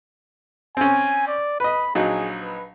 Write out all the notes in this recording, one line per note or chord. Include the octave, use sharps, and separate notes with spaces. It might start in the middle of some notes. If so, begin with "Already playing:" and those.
C4 C#4 G#5
D5
B4 D#5 B5
A#1 F#3 D#4 G#4
B4